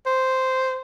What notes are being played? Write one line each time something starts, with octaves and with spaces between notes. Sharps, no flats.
C5